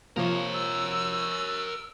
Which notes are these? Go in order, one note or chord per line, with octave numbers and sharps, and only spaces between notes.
C3 F3 A#3 A#4 C#5
E6